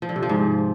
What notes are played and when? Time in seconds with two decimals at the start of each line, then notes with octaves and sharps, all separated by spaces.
0.02 F3
0.09 D3
0.16 C3
0.23 F3
0.29 G#2